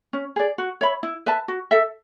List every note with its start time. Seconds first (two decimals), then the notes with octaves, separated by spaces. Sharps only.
0.13 C#4
0.36 G#4 D5
0.58 F#4
0.81 C#5 E5 B5
1.03 E4
1.26 B4 E5 A5
1.48 F#4
1.71 A4 E5